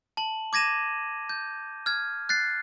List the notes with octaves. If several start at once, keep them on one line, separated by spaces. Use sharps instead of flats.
A5 F#7
D6 G#6 A#6 D#7 E7
G6
F6 G#6
F#6 A6 C7